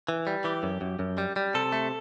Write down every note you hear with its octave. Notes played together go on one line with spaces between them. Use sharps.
E3
G3
E3 G4
F#2
F#2
F#2
G3
G3
C3 A4
A3